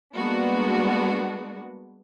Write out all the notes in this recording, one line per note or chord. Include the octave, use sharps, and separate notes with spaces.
G3 G#3 A#3 B3 D4 F#4